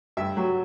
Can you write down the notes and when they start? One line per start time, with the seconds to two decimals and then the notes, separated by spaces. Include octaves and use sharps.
0.17 G2 E5
0.37 F#3